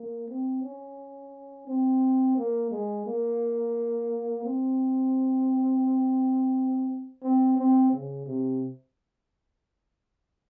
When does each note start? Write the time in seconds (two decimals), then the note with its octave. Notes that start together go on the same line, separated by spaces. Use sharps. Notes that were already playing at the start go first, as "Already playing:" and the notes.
Already playing: A#3
0.28 C4
0.63 C#4
1.67 C4
2.37 A#3
2.71 G#3
3.06 A#3
4.44 C4
7.23 C4
7.58 C4
7.92 C#3
8.26 C3